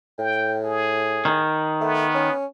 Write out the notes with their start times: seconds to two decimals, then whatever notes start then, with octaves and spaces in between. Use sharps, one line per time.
0.19 A2 G5
0.64 G#4
1.25 D#3
1.81 A3 B3
2.15 C#4